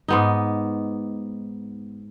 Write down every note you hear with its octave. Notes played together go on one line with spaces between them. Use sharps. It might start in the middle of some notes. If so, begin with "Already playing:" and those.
G#2 B3 D#4